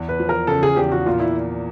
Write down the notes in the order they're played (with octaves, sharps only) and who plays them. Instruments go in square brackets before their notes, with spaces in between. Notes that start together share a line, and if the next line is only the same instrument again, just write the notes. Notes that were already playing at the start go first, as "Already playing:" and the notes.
Already playing: [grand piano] E2
[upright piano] B4
[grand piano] F3
[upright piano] A#4
[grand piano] C#3 [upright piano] A4
[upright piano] G#4
[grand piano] E2 [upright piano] G4
[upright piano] F#4
[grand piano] A#2 [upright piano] F4
[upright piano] E4